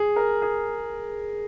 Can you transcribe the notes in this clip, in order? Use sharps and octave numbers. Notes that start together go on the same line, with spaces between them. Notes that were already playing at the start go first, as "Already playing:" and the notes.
Already playing: G#4
A#4
G#4